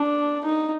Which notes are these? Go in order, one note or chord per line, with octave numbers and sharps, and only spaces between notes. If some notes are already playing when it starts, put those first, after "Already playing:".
Already playing: D4
D#4